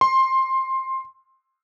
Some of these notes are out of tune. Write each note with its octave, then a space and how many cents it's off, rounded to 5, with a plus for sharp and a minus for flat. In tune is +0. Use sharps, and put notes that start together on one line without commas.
C6 +15